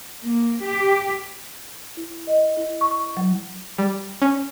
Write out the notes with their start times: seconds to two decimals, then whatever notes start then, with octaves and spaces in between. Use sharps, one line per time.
0.25 A#3
0.62 G4
1.97 E4
2.27 D#5
2.57 E4
2.81 C#6
3.17 F#3
3.78 G3
4.22 C#4